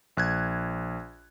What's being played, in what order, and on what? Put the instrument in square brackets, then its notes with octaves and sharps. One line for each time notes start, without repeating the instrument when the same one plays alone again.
[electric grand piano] A#1 F#6 G#6